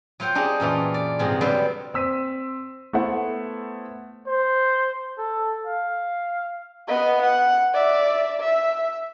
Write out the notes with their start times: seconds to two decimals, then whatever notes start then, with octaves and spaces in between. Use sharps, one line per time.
0.20 F#3 F4 C5 F#5 G5
0.35 D4 D#4 G4 G#4
0.60 F#2 A#2 E3 F4
0.94 D5
1.19 G#2 C3 F3 G#3 C4
1.41 D3 F#3 G3 B3 D5 C6
1.94 C4 E6 B6 D#7
2.93 A3 B3 E4 C5 E5 F#5
4.27 C5
5.18 A4
5.67 F5
6.88 B3 D#5
7.22 F#5
7.74 D5 E5
8.40 E5